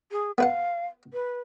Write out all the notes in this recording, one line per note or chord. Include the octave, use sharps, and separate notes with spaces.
G#4
B3 B4 F5 F#5
B4